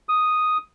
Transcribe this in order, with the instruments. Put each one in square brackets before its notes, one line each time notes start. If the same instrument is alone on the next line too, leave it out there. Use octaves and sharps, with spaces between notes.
[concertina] D#6